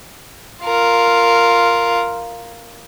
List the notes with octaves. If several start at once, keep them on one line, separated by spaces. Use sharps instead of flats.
F4 A#4